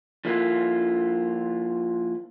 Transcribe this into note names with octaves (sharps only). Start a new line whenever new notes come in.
F3 A#3 E4 F4 A4